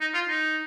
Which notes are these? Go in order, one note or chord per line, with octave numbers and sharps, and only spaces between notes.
D#4
F4
D#4